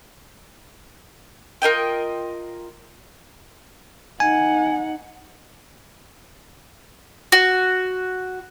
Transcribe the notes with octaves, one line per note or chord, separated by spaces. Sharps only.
F4 A#4 D#5 G5
D#4 F#5 G#5
F#4